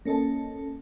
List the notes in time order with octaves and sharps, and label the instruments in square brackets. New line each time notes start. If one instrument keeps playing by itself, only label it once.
[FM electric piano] A#3 C#4 A4 D#5 A5